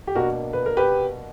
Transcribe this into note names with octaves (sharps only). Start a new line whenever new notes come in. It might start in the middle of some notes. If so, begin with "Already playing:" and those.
G4
B2 A#3 D4 F#4 A#4
B4
A#4
G4 B4